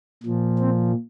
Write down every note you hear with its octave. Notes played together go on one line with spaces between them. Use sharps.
A#2 F3
C4